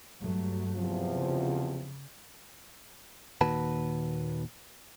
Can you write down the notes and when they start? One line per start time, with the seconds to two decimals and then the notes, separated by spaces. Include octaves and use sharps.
0.20 G2 F#3 A3
0.76 E2 C3 F3
1.13 C#3
3.41 D#2 A#2 D#3 F#4 B4 A5